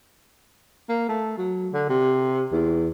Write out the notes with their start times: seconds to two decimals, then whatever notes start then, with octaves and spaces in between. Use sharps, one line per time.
0.89 A#3
1.09 A3
1.38 F#3
1.73 D3
1.89 C3
2.52 E2